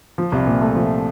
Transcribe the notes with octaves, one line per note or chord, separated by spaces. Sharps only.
F3
C2
A#2
A3
F3